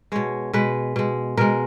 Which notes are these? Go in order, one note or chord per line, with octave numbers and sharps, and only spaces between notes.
B2 G#3 C#5
B2 G#3 B4
B2 G#3
B2 G#3 A#4